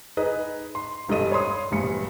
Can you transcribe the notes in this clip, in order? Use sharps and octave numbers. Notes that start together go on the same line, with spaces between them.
D#4 G#4 B4 D#5
C6
E1 G2 A4 D#5 D#7
C#5 B5 C6 D#6
E1 A#1 G2 C#7